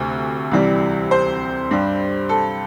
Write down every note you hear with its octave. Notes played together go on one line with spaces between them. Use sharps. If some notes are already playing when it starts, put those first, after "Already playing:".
Already playing: D2 C3
C2 C3 E3 G3
C5
G2 G3
A4